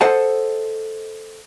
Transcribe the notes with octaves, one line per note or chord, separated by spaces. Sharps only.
A4 C5 D#5 F#5 A5